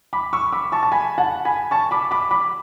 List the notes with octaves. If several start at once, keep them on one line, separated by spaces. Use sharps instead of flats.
B5 D6
C#6 E6
B5 D6
A5 C#6
A5
G#5 B5
F#5 A5
G#5 B5
A5 C#6
B5 D6
B5 D6
B5 D6